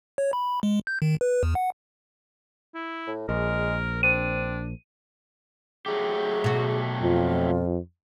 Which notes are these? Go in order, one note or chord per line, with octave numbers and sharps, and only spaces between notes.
C#5
B5
G#3
G6
D#3
B4
E2
F#5
E4
A2
A#1 G#3 A#4
C4 D4 D#7
F#3 A3 G4 G#4
B2 F#4
F2 F4